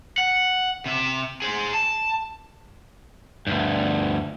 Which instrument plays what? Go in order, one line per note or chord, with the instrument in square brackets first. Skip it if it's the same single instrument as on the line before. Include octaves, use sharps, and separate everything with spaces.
[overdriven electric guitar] F#5
C3 E5
G#4 C5
A5
D2 G2